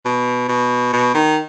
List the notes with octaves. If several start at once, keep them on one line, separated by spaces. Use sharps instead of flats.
B2
B2
B2
D#3